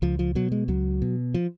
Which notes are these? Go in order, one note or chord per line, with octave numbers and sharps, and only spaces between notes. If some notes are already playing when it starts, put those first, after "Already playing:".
C#2 F3
F3
B2 F#3
G#3
C#2 F#3
B2
F3